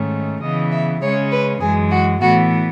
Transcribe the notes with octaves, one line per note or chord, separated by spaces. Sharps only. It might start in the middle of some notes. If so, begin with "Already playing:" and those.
Already playing: G#2 D#3 A3 C#4
C#3 E3 B3 D#5
E5
C#3 G#3 C#4 C#5
B4
F#2 E3 G#3 G#4
F#4
A2 E3 B3 F#4